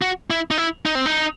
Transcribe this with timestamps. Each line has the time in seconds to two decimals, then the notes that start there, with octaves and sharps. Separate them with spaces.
0.02 F#4
0.30 E4
0.51 D#4
0.58 E4
0.86 D#4
0.95 C4
1.06 D#4